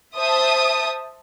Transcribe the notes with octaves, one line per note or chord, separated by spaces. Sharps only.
C5 E5 A5 D#6